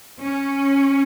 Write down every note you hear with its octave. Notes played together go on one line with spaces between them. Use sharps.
C#4